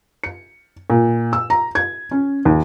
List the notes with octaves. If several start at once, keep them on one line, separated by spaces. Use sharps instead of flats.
C#7
A#2
E6
A#5
G#6
C#4
D#2